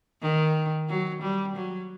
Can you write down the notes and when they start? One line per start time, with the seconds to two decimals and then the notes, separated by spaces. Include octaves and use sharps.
0.22 D#3
0.89 F#3
1.22 G3
1.55 F#3